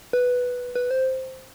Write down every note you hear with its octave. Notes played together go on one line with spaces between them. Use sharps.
B4
B4
C5